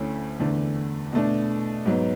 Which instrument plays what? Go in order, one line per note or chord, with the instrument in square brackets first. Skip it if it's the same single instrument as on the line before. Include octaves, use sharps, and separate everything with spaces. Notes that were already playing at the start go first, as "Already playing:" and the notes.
Already playing: [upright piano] D2 D3 A3 C#4 E4
E2 D3 A3 D4
B2 A3 D4
G#2 F#3 B3